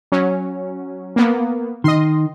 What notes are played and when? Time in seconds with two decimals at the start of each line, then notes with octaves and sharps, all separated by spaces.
0.12 F#3 C#4
1.16 A#3 B3
1.84 D#3 D#5 C6